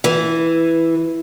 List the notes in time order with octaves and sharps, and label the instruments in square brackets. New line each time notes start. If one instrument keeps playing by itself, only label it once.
[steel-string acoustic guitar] E3